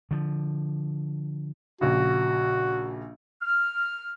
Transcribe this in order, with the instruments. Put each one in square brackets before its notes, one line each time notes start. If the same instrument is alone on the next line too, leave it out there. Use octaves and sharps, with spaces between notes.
[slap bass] D3 F3
[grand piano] A#1 C#3 [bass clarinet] F#4
[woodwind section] F6